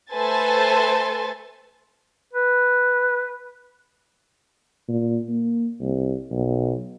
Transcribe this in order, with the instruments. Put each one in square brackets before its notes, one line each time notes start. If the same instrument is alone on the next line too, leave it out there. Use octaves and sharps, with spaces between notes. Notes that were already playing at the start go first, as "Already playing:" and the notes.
[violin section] A3 A4 B4 C5 G#5 A6
[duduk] B4
[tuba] A#2
A#3
C2
B1